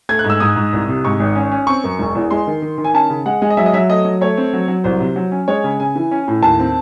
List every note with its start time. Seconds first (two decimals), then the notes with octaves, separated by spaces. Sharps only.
0.09 A3 G#6
0.19 F#6
0.24 G#2
0.30 E6
0.40 G#2 D#6
0.56 G#2
0.73 C2
0.88 C3
1.04 G#2 C#6
1.20 G#1
1.35 C#4
1.52 C#4
1.67 C4 C#6
1.84 F#2
1.99 E1
2.15 E2
2.31 G#3 C6
2.47 D#3
2.62 D#3
2.78 D#3
2.84 G#5
2.94 C#4 A5
3.10 C#3
3.26 G#3 F#5
3.42 G#3
3.50 D#5
3.57 F#3 E5
3.66 D#5
3.73 F#3 E5
3.89 A3 D#5
4.05 F#3
4.21 A3 C#5
4.38 C4
4.53 F#3
4.68 F#3
4.84 C2 C5
5.00 C3
5.16 F#3
5.32 C#4
5.48 G#3 C#5
5.64 C#3
5.80 C#3 G#5
5.96 E3
6.11 C#4
6.28 A2
6.43 D#2 A5
6.60 C4